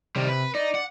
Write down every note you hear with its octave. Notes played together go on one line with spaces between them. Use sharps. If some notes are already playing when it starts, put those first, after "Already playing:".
C3 D#3 G3
B4
D#4 D5
F#5